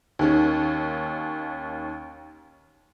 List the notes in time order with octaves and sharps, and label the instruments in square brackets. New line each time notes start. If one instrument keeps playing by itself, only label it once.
[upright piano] D#2 D#3 C#4